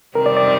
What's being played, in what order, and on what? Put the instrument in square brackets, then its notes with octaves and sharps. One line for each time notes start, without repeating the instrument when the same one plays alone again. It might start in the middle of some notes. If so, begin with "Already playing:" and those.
[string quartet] C3 D#3 G3 C4 [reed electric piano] A#4
[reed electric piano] D5
D5